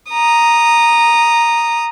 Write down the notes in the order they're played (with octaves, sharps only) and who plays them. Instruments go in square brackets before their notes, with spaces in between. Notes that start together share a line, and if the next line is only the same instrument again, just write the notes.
[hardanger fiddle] A#5 D#6